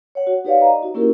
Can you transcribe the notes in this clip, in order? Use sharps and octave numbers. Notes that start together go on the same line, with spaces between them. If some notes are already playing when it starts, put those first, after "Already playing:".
C#5 F#5
F#4
D#4 G4 B4 C#5 D5 F5
D5 D#5 A#5
D#4 F#4
A#3 C#4 E4 F#4 G4 A#4